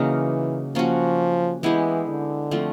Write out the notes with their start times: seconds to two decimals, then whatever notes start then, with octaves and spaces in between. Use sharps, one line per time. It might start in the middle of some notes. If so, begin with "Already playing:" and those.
Already playing: C#3 E3 F#3 A#3 D#4
0.75 F3 A#3 C#4 F#4
1.63 E3 G#3 B3 E4 G4
2.07 D3
2.51 F3 A3 C4